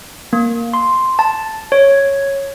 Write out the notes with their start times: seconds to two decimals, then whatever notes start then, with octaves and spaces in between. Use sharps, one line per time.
0.33 A#3
0.73 C6
1.19 A5
1.72 C#5